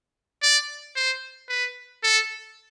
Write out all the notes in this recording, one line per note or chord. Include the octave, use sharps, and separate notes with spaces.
D5
C5
B4
A4